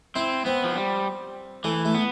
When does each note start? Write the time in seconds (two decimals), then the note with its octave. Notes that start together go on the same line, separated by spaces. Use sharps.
0.15 C4 E4
0.45 B3 C4
0.64 F3
0.76 G3
1.64 E3 A3
1.85 A3
1.95 B3